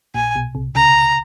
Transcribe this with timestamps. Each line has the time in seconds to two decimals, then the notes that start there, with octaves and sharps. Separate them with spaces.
0.14 A#1 A#2 G#5
0.35 B1 B2
0.55 C2 C3
0.75 C#2 C#3 A#5